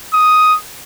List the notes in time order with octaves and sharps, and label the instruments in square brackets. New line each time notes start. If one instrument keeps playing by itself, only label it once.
[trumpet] D#6